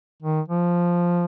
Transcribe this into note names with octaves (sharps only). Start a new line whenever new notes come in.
D#3
F3